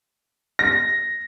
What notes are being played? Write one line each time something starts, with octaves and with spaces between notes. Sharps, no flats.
A#6